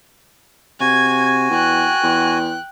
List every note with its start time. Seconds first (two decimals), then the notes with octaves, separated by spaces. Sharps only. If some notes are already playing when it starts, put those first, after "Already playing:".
0.80 C3 F#4 G#5 G#6
1.50 E2 G5 F#6
2.03 E2